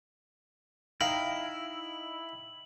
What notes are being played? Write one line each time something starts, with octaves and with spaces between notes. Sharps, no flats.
D#4 E4 D#5 F5 G5 F#7